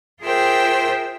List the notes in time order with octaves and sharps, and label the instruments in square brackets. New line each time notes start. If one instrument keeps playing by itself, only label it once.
[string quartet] F4 G#4 A#4 C5 E5 G5